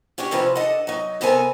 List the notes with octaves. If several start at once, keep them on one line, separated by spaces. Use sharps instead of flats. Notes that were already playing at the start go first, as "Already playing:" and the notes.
C#4 D4 F#4 G4 C#5
C3 F3 C4 C#4 B4
D4 A4 D#5 F#5
F#3 D#4
C3 B3 C4 A4 A#4 G#5